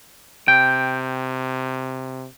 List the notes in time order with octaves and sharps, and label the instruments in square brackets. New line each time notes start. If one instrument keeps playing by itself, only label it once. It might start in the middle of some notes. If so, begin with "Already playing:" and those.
[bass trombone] C3 [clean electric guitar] G5